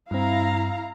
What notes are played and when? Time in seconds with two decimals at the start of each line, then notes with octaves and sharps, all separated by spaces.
0.11 G2 C4 E4 F5 A#5